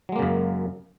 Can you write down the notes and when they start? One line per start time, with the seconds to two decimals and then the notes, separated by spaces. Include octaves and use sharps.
0.09 F#3
0.12 G#3
0.16 A#3
0.19 C#3
0.22 F#2